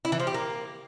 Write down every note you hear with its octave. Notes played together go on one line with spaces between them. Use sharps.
E4
E3
F3
G4
A#3